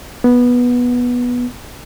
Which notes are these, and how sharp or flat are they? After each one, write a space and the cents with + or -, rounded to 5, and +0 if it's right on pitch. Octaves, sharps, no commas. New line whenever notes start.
B3 -10